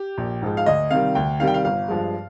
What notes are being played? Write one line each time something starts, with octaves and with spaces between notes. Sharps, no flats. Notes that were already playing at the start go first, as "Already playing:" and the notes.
Already playing: G4
A#1
G#2 F3 G#3
F5
D2 D#5
C3 D#3 G3 F5
D2 G5
C3 D#3 G3 F5
G5
F5
G1 F5
G2 F3 G#3